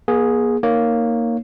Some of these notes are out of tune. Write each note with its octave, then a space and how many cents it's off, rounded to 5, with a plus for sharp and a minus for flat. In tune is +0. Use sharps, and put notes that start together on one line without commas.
A#3 +45 G#4 +0
A#3 -5 D#4 +0 C#5 +0